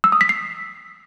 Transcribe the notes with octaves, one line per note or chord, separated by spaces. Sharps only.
E6
D#6
B6
C7